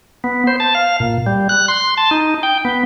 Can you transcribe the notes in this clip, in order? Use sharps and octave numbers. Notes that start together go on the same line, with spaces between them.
B3
C5
A5
F5
A#2
G3
F#6
C6
A5
D#4
G5
B3